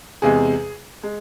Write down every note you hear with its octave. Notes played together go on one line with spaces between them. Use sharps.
E2 C3 G#3 G#4
G#3